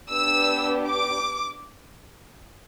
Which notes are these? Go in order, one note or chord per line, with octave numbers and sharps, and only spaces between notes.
B3 D4 G4 E6
D6